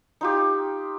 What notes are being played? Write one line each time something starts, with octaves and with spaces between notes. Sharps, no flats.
D#4 F4 G4